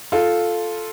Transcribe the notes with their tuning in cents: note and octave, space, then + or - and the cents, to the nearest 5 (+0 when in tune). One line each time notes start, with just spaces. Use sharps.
F4 +0 A4 -5